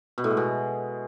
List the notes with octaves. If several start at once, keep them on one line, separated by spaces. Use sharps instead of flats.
B2
A2
G#3
B2